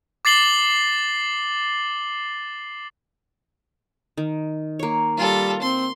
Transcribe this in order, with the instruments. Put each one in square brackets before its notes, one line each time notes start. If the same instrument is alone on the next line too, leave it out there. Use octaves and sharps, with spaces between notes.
[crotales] D6 A6 C7 F#7 G7
[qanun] D#3
A#3 C#5
[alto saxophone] G3 [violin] F4 A4
[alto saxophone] C4 [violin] C6